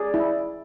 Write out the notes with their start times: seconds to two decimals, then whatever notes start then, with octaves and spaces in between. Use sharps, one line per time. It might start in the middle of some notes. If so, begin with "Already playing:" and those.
Already playing: G#4 D5
0.14 E4